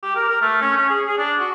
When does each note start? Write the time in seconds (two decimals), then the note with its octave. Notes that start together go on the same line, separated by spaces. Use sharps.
0.03 G4
0.16 A#4
0.29 A#4
0.42 A3
0.61 C#4
0.77 C#4
0.89 G#4
1.06 G#4
1.18 D4
1.39 F#4